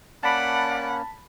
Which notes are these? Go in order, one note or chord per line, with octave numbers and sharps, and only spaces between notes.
A#3 C#4 D5 F#5 A5 B5